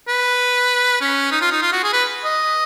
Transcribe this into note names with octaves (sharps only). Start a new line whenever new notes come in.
B4
C#4
D#4
F4
D#4
F4
F#4
G#4
B4
D#5